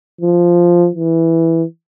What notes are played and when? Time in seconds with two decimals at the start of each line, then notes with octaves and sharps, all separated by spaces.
0.21 F3
0.95 E3